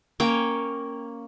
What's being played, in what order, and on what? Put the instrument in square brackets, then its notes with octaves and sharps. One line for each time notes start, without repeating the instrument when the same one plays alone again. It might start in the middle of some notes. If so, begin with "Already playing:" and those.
[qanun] A#3 C#4 C#5 G5